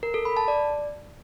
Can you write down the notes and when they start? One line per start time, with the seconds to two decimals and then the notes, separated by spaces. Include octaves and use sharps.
0.03 A#4
0.14 A4
0.25 B5
0.37 A5
0.48 D5